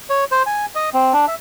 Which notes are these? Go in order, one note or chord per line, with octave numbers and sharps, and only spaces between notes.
C#5
C5
G#5
D#5
C4
D4
E5